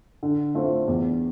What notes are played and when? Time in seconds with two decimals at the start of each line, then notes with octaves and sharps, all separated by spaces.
0.23 D3
0.55 A3 C4 F4
0.87 E2